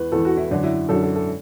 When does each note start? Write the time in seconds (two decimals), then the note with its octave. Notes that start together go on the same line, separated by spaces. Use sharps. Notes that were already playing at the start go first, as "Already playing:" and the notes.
Already playing: E2 E3 B4
0.12 E2 E3 A4
0.25 F#4
0.37 E4
0.51 F#2 D3 D4
0.63 E4
0.89 F#2 D3 A4
1.02 A4
1.15 A4